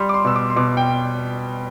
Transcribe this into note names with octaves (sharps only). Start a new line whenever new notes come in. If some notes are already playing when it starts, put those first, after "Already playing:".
Already playing: G3 C6
D6
C6
B2 E6
D6
C6
B2 D6
G5